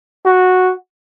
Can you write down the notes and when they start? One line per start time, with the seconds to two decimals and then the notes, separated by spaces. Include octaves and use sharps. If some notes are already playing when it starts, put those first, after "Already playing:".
0.25 F#4